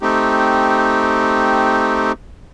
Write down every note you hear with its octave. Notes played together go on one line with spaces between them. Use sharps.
A3 C4 D#4 G4